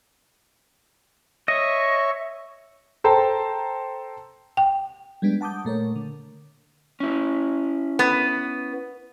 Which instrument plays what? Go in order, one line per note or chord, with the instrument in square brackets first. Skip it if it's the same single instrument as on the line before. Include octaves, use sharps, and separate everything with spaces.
[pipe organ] C#5 E5 C#6 [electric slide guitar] D#5
[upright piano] A4 C5 G5 A5 A#5
[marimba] G5
[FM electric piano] G3 G#3 B3 D4
F#5 A5 D6 D#6 G6
A#2 A3 A#4 C#5
D3
[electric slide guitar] C#4 E4
[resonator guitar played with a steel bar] B3